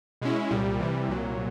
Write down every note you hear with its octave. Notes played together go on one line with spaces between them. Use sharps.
B2 G#3 C#4 E4
C2 A#2 G3
C3 E3 G3
C2 A#2 F#3